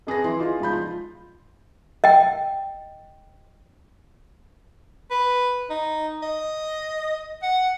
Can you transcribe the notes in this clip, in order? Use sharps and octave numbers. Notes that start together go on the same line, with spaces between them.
F2 G#4 B4 A#6
E3 E4 C6
D#4 F4 G#4
E1 F3 B5 G6
F4
D#5 G5
B4
D#4
D#5
F#5